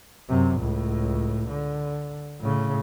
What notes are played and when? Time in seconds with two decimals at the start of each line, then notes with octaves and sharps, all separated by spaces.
0.29 F#2 C3
0.60 C#2 A2
1.49 D3
2.40 A2 C#3